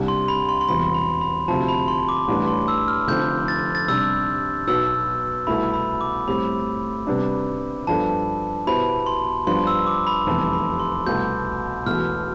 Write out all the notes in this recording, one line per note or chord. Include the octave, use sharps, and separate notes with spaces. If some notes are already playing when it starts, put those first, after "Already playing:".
Already playing: C2 C3 G3 D4 G4
C6
B5
C6
C6
E1 E2 C3 G3 B5
B5
B5
D2 C3 F3 A5
B5
C6
D6
A1 A2 G3 B3 D4
C6
E6
F6
F1 F2 D3 F3 C4 G6
A6
A6
C3 G3 D4 E6
B1 B2 B3 E6
C2 B2 A3 E4 B5
B5
D6
A2 G3 C4 G4 B5
C3 G3 B3 D4
G2 F3 B3 D4 A4 A5
B2 B3 E4 G4 C5 B5
C6
G2 F3 B3 D4 G4 C6
E6
D6
B5
F1 E2 C3 G3 A5
B5
C6
C2 B2 A3 G6
E1 E2 B2 A3 F6